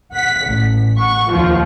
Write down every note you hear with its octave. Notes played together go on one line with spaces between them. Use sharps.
F#5 B6
A1
F#5 C#6
D#2 F3 F4